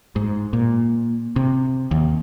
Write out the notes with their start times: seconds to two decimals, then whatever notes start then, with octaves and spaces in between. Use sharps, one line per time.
0.16 G#2
0.53 A#2
1.36 C3
1.91 D#2